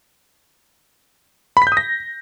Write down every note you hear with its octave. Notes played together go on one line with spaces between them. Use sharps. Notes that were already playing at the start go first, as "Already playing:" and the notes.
B5
B6
G6
D#6
A#6